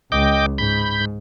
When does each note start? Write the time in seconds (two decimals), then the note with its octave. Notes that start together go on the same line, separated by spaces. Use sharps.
0.12 C#2 D#5 G5 D6
0.58 G#2 B5 G6